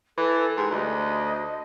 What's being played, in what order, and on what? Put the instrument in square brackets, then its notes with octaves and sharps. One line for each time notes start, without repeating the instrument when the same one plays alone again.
[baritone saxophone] E3 [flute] A4
[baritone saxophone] G#2 [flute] G4
[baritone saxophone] D2 [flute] D#5